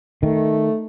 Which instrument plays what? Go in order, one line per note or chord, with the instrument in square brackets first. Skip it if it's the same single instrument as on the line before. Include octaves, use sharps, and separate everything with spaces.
[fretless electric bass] D#3 [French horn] A3